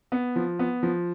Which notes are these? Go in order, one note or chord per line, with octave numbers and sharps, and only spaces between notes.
B3
F3
B3
F3